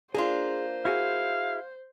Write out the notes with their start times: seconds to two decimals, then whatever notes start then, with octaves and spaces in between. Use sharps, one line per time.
0.14 A#3 D4 F4 G#4 C5
0.85 E4 F#4 G#4 F5